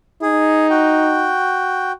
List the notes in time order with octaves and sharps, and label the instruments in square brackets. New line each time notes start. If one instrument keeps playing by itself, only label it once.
[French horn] D#4 [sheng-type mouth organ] G#4
[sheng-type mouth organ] F#4 G5